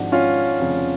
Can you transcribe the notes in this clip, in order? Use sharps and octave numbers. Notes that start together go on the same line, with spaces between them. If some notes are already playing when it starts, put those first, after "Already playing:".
Already playing: G#1 G#2 F3 D4 F#4
C#4 F4
F1 F2 C#3 F3